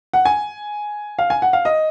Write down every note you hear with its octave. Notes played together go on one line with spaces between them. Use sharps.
F#5
G#5
F5
G#5
F#5
F5
D#5